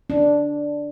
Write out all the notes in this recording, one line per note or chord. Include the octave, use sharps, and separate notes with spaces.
D4